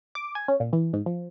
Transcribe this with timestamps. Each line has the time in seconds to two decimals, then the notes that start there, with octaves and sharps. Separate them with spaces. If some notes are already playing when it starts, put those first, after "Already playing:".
0.15 D6
0.35 G#5
0.48 C#4
0.60 A#2
0.73 E3
0.93 G#2
1.06 F3